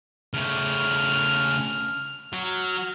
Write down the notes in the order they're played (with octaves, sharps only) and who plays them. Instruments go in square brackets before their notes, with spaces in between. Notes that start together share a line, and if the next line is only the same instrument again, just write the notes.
[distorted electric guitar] C#3 A3 [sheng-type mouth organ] F6
[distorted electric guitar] F#3